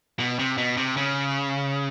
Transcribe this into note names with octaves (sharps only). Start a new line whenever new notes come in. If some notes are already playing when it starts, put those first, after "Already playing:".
B2
C3
B2
C3
C#3